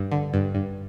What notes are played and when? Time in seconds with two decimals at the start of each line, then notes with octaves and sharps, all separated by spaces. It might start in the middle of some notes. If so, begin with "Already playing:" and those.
Already playing: G2
0.11 D3
0.34 G2
0.55 G2